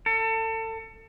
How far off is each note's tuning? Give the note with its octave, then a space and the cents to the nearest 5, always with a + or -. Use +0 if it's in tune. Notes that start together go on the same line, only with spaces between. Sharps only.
A4 +30